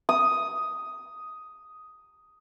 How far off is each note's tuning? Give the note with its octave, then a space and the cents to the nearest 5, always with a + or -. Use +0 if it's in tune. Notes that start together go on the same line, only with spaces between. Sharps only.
D#6 +5